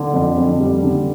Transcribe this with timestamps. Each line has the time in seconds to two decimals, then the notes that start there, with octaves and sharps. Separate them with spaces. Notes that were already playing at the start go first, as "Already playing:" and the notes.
Already playing: D3
0.14 F2
0.37 F2
0.60 G3
0.83 D3